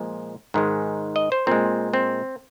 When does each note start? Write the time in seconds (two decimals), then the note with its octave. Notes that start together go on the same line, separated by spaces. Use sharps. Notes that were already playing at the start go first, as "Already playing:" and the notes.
Already playing: A#2 F3 G#3
0.54 G#2 D#3 G#3
1.16 D#5
1.32 C5
1.47 A#2 G#3 C4
1.94 C4